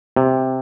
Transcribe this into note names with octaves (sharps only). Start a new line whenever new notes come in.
C3